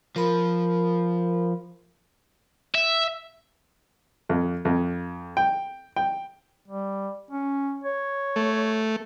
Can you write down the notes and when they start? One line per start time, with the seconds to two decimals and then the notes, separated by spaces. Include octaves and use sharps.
0.16 F3 A#4 B5
2.75 E5
4.29 F2
4.65 F2
5.37 G5
5.96 G5
6.68 G3
7.31 C#4
7.84 C#5
8.36 A3